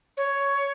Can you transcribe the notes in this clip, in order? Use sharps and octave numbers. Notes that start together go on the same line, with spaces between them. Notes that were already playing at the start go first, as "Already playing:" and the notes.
C#5